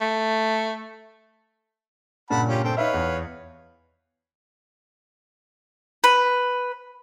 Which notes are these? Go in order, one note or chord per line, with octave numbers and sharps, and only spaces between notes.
A3
G2 A#2 C#3 F#5 A5 B5
C#4 F4 G4
C4 A4 G5
D#4 B4 C#5 E5 F5
E2
B4